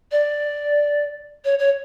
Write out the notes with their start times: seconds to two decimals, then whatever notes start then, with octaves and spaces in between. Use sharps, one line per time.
0.12 D5
1.45 C#5
1.59 C#5